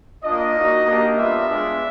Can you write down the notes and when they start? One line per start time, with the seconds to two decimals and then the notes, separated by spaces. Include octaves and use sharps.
0.24 A#3 D4 F4 D#5
0.55 A#3 D#4 F#4
0.87 A#3 D4 G4
1.17 G3 B3 D4 F4 E5
1.49 G#3 B3 D4 F4